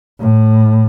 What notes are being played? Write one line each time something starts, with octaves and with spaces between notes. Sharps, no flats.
A2